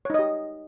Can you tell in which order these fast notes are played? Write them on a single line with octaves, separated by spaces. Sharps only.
C#5 D#4 D#5 G4